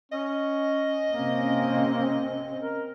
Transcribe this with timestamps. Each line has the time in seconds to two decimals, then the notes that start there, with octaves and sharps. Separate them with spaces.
0.12 C#4 D#5
1.11 C3 A#3 C4 C#4
2.63 A#4